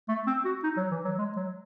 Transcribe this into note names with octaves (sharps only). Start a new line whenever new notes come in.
A3
C4
F#4
D#4
F#3
E3
F#3
G#3
F#3